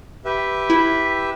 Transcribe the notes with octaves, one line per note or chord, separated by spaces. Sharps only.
G4 B4 E5
E4